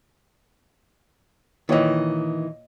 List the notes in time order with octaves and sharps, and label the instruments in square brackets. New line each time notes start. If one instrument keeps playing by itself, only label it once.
[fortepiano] A#2 C#5 D#5 [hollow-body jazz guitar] D#3 E3